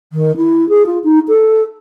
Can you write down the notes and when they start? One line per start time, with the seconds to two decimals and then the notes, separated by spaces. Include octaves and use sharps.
0.13 D#3
0.37 E4
0.69 G#4
0.86 F4
1.04 D#4
1.28 A4